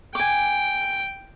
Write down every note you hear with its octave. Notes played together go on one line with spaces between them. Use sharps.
G5 G#5 D6